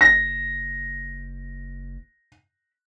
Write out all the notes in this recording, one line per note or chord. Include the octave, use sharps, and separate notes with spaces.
F#1 A#6